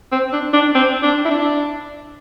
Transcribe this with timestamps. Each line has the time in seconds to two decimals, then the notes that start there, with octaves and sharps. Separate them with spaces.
0.12 C4
0.33 D4
0.53 D4
0.75 C4
1.03 D4
1.25 E4
1.31 D4